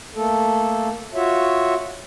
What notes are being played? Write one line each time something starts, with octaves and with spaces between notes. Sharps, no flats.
A3 A#3 A4
F4 F#4 C#5 E5